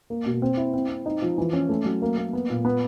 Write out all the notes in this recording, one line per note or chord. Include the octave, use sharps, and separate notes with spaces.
A#3
B2
C4
E4
C4
C4
D#4
F3
E3
C#4
A3
F#3
A#3
A#3
B3
A#2
B3